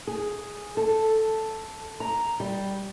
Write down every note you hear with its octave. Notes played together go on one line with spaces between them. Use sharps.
G#4
A4
A#5
G3